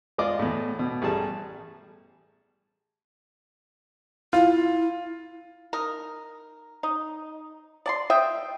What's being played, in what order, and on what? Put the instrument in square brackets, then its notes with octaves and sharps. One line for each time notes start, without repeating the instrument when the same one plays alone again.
[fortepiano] G#3 F4 G#4 D5 D#5 D6
E2 A2
B2
A1 G3 G#4 A5
[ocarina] E4 [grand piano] F4
[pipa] D#4 A#4
D#4
D5 A5 C6
D#5 E5 G5